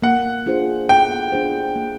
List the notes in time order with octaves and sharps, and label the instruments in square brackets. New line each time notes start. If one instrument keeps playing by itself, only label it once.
[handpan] A#3 [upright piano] F#5
[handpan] D4 F4 G#4 C5
[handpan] A#3 [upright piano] G5
[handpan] D4 F4 G#4 C5
A#3